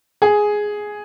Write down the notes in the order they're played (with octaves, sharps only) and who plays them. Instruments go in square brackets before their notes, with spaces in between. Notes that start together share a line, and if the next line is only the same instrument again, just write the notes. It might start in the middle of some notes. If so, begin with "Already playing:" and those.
[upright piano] G#4